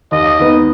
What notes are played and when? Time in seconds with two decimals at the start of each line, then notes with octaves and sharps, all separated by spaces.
0.12 D#2 D#5
0.40 D#3 B3 D#4